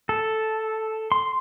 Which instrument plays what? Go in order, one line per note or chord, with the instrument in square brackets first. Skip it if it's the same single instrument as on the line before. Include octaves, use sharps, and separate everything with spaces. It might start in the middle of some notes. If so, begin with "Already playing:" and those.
[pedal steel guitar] A4
C6